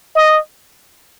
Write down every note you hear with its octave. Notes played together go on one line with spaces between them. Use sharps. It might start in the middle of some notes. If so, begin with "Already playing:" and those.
D#5